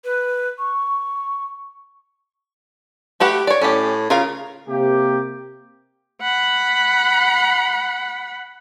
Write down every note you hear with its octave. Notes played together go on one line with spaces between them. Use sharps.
B4
C#6
A3 G4 B4 F#5
C#5 D5
A2 C#4 G4
C#3 F4 A#4 F5
C3 A#3 G4
F#5 B5